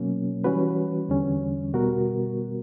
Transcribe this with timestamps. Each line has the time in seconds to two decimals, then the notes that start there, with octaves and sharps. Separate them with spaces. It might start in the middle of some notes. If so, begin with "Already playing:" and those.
Already playing: B2 F#3 A#3 C#4
0.44 E3 G3 C#4 F#4 B4
1.09 E2 D3 G3 C#4
1.74 B2 G3 B3 F#4 A#4